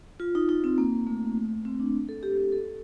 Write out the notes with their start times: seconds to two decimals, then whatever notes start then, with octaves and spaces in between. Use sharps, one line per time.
0.20 F4
0.35 D#4
0.49 D#4
0.64 C4
0.78 A#3
1.07 A3
1.65 C4
1.80 D4
2.09 A4
2.23 G4
2.37 G4
2.52 A4